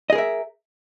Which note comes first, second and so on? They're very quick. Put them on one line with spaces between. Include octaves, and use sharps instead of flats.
D#5 G#4 A#4 E5